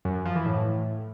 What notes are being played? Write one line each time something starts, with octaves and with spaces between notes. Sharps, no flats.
F#2
F#2
F3
E3
A2